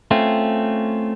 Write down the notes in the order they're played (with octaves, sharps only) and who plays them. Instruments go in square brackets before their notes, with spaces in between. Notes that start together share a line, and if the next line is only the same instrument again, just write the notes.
[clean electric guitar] A3 C4 C#4 F4